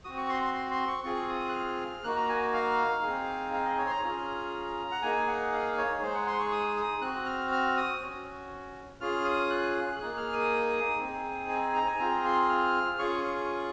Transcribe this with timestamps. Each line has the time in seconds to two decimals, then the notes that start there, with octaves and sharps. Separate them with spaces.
0.04 C4 F#4 D#6
0.17 C#6
0.29 C6
0.42 C6
0.54 C6
0.71 C6
0.88 C#6
1.04 C4 F4 G#4 C#6
1.29 D#6
1.49 F#6
1.54 F6
2.04 A#3 D#4 F#4 F#6
2.16 A#5
2.29 G#5
2.54 F5
3.03 C4 D#4 G#4
3.53 F5
3.65 D#5
3.78 C#5
3.86 C6
3.91 A#5
4.03 C#4 F4 G#4
4.91 F#5
5.02 A#3 D#4 G#4 G#5
5.27 F#5
5.52 F5
5.77 C#5
6.02 G#3 D#4 G#4 C5
6.15 F#5
6.27 C6
6.39 C#6
6.52 D#6
6.77 D#6
7.01 C4 F#4 F#6
7.26 F6
7.51 F6
7.77 D#6
8.01 C#4 F#4
9.01 C#4 F4 G#4 F6
9.25 D#6
9.50 F#6
10.00 A#3 D#4 G#4 F#6
10.17 F6
10.33 D#6
11.00 C4 D#4 G#4
11.49 G#5
11.62 G#5
11.74 A#5
11.87 G#5
11.99 C4 F4 G#4 A#5
12.24 C6
12.49 F6
12.99 C#4 F4 G#4 C#6
13.24 C#6